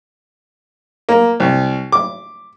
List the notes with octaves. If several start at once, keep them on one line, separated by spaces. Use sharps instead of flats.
A#3
C2
D6